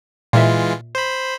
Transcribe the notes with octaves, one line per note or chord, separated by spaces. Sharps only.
A#2 E3 G#3 F4 E5
C5 B5